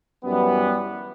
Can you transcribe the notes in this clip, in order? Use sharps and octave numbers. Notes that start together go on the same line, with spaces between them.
F#2 E3 G3 B3